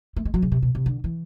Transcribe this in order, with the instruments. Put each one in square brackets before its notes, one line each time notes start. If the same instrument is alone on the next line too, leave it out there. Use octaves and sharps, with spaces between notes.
[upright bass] A3
G#3
F#3
C#3
C3
B2
C3
D3
E3